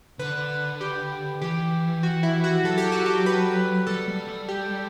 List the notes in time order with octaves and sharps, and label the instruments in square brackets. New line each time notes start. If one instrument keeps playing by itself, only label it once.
[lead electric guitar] D3 [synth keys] B4
[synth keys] G4
[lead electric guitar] E3 [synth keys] G4
[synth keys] F#4
E4
F#4
[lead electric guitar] F#3 [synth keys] A4
[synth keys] G4
F#4
G4
B4
[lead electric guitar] G3 [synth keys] A4
[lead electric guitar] G3
G3
[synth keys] G4